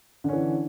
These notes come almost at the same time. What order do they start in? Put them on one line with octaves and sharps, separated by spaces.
D3 C#4 E3